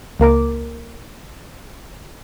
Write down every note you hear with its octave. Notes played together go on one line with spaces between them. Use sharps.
C#2 A#3 A#4 D6